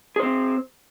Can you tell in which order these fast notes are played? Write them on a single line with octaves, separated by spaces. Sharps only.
G#4 C5 C4